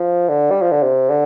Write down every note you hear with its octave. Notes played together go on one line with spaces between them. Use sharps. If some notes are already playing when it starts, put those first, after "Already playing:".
Already playing: F3
D3
G3
F3
D3
C3
D3